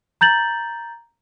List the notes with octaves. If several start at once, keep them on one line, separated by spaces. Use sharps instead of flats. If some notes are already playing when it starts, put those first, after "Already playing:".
A#5 G6 A6 F#7